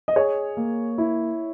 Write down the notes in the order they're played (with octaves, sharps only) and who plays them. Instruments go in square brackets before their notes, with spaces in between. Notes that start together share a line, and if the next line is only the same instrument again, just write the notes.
[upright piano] D#5
[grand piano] G#4 [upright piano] C#5
[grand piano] A#3
E4